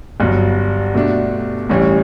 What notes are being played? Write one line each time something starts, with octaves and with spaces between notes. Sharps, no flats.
G1 G2 F#3
B2 A3 D4
A1 A2 E3 G3 C#4